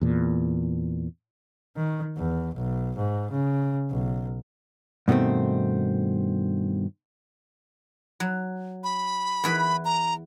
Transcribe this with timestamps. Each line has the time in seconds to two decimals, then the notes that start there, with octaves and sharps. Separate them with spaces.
0.01 E2 A#2
1.77 D#3
2.17 E2
2.55 B1
2.97 G#2
3.31 C#3
3.91 B1
5.08 G2 B2 D#3 A3 C4
8.20 F#3
8.84 B5
9.44 E2 E4 B4
9.85 A#5